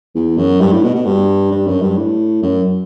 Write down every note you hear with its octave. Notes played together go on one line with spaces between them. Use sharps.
E2
F#2
G2
A2
B2
B2
G2
G2
F#2
G2
A2
F#2